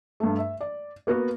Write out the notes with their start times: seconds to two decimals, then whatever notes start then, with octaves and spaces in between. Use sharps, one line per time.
0.20 G2 A3
0.38 E5
0.61 D5
1.07 A#3 B3 F#4